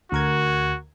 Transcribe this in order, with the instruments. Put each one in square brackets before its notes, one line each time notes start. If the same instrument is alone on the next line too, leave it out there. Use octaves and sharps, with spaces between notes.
[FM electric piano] D2 A#4 G#6 [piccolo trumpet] F#4